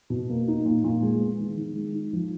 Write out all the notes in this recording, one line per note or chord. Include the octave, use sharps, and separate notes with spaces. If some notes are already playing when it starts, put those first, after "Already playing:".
B2
A#3
D#4
A#2
A#2
G#3
B3
D#3
D#3
G#3
D#4
F3